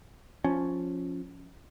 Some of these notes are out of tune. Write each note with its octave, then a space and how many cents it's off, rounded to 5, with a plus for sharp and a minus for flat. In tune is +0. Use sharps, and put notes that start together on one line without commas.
F3 +10 C#4 +0